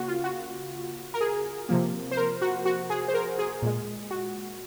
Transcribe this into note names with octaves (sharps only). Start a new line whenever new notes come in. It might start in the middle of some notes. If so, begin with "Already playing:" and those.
Already playing: C#3 A#3 F#4
F4
F#4
A#4
G#4
C3 F3 A#3
C5
A#4
F#4
F#4
G#4
C5
A#4
G#4
A#2 G#3
F#4